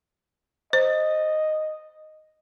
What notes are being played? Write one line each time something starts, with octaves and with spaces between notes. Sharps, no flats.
C5 D#5